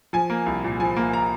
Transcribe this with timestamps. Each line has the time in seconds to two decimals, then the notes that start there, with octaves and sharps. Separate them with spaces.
0.13 F3 G#5
0.30 A#3
0.46 C2
0.64 A#2
0.80 F3 G#5
0.96 A#3
1.13 A#5